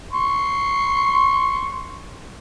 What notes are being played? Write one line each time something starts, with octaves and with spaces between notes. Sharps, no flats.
C6 C#6